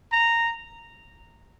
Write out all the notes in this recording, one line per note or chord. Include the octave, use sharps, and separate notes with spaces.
A#5